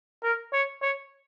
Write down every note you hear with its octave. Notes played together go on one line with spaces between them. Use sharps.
A#4
C#5
C#5